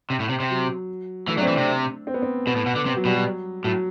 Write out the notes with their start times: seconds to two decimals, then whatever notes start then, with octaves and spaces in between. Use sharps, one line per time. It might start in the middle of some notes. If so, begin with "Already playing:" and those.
0.10 C3
0.20 A2
0.29 C3
0.40 C3
0.50 F#3
1.28 E3 A3
1.36 F#3 D4
1.42 C4
1.48 E3
1.55 C3 D4
2.07 C4
2.14 B3
2.22 C4
2.47 B2 B3
2.56 A2
2.66 B2
2.76 D3
2.86 C3
2.96 F#3
3.05 B2 G3
3.16 F#3
3.64 A2 F#3